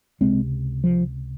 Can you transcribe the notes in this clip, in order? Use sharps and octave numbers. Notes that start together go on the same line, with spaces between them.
C#2 C3 G#3 C4
F3